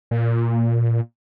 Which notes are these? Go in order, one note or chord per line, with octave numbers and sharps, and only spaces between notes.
A#2